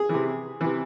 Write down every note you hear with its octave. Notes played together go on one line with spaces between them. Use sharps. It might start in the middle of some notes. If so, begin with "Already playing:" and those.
Already playing: G#4
C3 E3
C3 E3